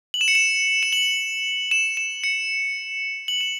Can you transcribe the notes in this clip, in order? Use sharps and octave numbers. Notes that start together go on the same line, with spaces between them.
F#7
E7
C#7
E7
E7
F#7
E7
E7
C#7
F#7
E7